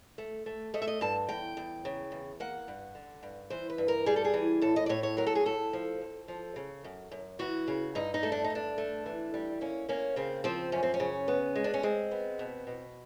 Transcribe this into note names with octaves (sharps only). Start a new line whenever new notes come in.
A3
A3
A3 D#5
E5
D#5
G2 A5
E2 G5
E2
C#3
E2
A#3 F#5
G2
D3
G2
E3 C5
B4
G2
A#4
G3 G#4
A4
G#4
E3
A2 A4
D#5
D5
A2 C#5
C#5
F#3 A#4
A4
G#4
A2 A4
F3
F2
F3
C#3
F#2
F#2
E3 F#4
C#3
G2 D#4
D#4
A3
D4
D#4
G2 D4
A3
E3
G3
A#3 C#4
A#3 C#4
C#3 C4
F3 C4
F#2 C#4
C4
C#4
C#3
B3
G#3
D4
C#4
G#3 C4
B3
B2
B2